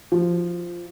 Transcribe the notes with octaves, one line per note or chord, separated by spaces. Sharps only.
F3